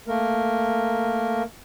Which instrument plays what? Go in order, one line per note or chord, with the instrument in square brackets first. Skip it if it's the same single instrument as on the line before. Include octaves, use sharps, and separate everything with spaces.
[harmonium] A3 A#3 A#4